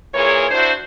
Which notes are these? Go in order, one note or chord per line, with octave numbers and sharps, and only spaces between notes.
A#2 E3 G#4 A#4 C#5
D4 E4 F#4 C5